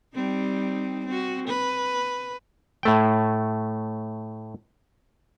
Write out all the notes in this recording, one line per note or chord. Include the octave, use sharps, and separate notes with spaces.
G3 C4 D#4
C4 F#4
B4
A2 A3 G5